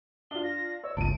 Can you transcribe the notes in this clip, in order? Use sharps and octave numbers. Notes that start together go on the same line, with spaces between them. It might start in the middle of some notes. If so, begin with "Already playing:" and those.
D4 F4 G7
A#6
C#5 E6
G1 C#2 A5 D7 D#7